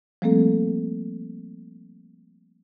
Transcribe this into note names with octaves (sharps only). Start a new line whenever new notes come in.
F3 G3 A3 A#3 C4 A4